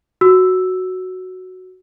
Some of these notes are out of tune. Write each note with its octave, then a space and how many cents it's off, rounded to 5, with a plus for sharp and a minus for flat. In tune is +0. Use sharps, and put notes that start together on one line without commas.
F#4 +0 E6 +0